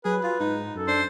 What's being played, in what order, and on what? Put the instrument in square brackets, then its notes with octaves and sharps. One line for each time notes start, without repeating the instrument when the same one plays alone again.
[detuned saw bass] F#3 [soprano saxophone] G#4 [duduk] B4
[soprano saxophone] F4
[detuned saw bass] G#2 [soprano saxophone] D#4
[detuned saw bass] F#2 [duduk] A4
[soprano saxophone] D4 [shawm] C5